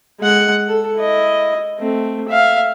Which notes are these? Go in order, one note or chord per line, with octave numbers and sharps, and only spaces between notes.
G#3 F#5
A4
E4 D#5
A3 C4
E5 F5